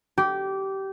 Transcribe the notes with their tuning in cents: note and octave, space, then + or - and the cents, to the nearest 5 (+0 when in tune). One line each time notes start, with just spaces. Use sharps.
G4 -20